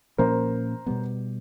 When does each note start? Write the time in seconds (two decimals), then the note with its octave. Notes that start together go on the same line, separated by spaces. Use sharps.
0.18 A#2 F3 A#3 C#4 A#4 C5
0.86 B2 G3 B3